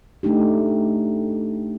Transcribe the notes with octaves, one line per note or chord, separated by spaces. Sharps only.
A3 D4 D#4 G4